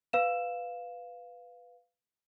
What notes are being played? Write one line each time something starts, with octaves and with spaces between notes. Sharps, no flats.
B4 F5 E7